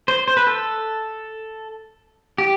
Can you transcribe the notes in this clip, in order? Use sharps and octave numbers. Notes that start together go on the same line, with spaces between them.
C5
C5
B4
A4
G4